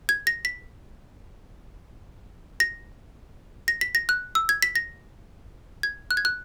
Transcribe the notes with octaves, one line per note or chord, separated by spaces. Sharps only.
G#6
A#6
B6
A#6
A#6
B6
A#6
F#6
E6
G#6
B6
A#6
G#6
F#6
G#6
F#6